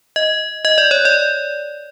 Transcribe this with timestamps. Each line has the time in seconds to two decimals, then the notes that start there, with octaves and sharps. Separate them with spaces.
0.16 D#5
0.65 D#5
0.78 D5
0.91 C#5
1.05 D5